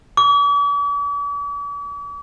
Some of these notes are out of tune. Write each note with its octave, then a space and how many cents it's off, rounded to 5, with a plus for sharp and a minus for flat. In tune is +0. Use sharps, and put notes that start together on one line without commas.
D6 -45